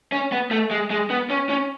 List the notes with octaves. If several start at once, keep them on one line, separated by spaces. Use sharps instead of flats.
C#4
B3
A3
G#3
G#3
B3
C#4
C#4